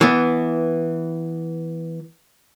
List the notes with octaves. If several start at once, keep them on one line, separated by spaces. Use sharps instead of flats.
E3 B3